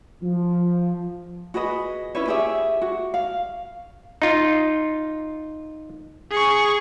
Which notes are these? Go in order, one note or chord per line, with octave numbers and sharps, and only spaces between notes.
F3
F#4 G#4 B4 D#5
C#4 E4 B4 C#5
G4 G#4 C#5 E5
F#4
F5
D#4 F4
G#4 C#6